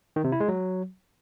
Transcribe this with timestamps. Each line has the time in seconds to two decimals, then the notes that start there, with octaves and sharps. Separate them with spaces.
0.16 D#3
0.24 C3
0.32 E4
0.40 G#3
0.48 F#3